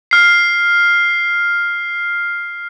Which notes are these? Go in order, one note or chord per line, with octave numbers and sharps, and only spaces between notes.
F6 C7